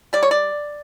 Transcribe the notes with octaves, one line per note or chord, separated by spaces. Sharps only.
G3 D5
C#5
D5